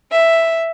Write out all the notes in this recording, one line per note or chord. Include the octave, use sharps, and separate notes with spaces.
E5